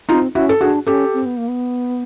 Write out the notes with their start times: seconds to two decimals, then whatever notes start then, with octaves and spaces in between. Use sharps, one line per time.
0.09 C4 D#4 F4
0.35 C#4 E4 F#4
0.49 A4
0.61 D4 F#4 G#4
0.87 C#4 G4 A4
1.14 C4
1.26 B3
1.37 A#3
1.48 B3